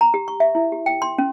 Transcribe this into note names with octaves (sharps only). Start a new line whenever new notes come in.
A#5
G4
C#6
E5
E4
G4
G5
C6
C#4